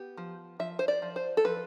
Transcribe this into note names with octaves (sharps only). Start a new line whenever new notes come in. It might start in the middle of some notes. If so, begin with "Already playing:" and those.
Already playing: B3 G4
F3
F3 E5
C5
D5
F3
C5
A4
F3 B4